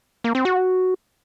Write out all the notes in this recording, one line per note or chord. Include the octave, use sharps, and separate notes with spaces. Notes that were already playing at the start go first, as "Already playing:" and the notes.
A#3
C4
F#4